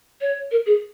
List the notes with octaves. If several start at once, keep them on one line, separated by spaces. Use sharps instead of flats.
C#5
A#4
G#4